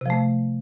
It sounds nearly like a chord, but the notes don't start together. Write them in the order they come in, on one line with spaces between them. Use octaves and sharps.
C3 F3 A3